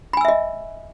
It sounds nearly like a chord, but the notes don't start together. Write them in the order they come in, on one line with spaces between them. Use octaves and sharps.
B5 G#5 E6 E5 D#5